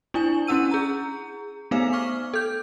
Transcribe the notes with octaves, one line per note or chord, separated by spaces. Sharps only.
D4 E4 G#5
C#4 E4 F#5 E6 D#7
G#4 A#5
A3 B3 D#4 C5 F5
C#6 D6 F6
A4 G6